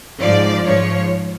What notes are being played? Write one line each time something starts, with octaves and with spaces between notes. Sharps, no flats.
G#2 F3 D5
G#2 F3 C#5